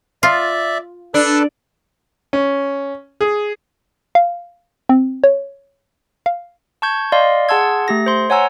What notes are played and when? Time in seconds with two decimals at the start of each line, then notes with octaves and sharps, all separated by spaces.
0.23 F4 D5 E5
1.14 D4 A4 B4 A5
2.33 C#4
3.21 G#4
4.15 F5
4.89 C4
5.24 C#5
6.26 F5
6.82 A5 C#6 G6 G#6
7.12 D5 D#5 F5 C6
7.49 G#4 F#5 A5 C6 E6 G#6
7.88 A3 G4 A#6
8.06 C5 C6
8.30 C#5 F#5 G#5 A#5 E6